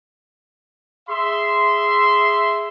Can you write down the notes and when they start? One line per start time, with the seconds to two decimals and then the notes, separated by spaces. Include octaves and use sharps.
1.08 G#4 E5 C6